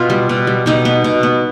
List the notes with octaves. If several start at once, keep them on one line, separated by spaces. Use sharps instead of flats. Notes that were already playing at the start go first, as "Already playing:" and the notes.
Already playing: B2 F4
G3
B2
G3
B2 D#4
B3
B2
B3